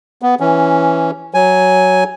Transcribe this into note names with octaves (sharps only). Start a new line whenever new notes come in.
B3
E3 C#4
F#3 G#5